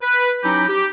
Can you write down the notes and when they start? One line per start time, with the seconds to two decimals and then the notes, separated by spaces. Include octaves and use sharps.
0.01 B4
0.43 F#3 C#4 D#4 E4 G4
0.67 G4